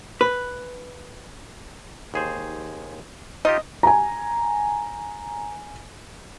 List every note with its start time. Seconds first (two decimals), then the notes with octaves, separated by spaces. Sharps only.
0.21 B4
2.14 D#2 G#4 C5
3.45 D#4 F4 G4 D#5
3.83 G#5 A#5